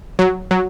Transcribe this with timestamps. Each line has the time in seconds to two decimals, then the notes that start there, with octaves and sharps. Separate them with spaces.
0.19 F#3
0.51 F#3